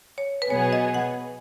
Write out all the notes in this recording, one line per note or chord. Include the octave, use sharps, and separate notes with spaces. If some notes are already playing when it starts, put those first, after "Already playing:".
C#5
B4
B2 F#3 B3 G#4 C#5
D#5
F#5